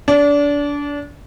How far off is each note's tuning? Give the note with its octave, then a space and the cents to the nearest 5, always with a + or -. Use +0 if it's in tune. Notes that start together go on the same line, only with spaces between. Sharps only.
D4 -25